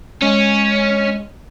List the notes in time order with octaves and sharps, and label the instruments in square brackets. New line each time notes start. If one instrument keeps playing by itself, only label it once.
[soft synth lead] G#3 [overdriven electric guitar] C#4